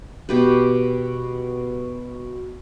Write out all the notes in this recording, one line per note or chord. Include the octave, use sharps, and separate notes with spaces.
B2 G4 B4